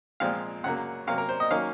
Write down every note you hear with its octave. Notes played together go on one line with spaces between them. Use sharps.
A#2 F3 G#3 C4 F5
F#2 C#3 F#3 A#3 F#5
C3 F#3 A#3 C#4 F5
A#4
C5
D#5
D#3 F#3 A#3 C#4 F5